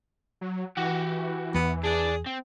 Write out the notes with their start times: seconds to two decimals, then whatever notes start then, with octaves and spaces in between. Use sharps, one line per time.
0.41 F#3
0.77 E3 F#4 G4
1.54 E2 B3
1.84 D4 G#4 D5
2.26 C4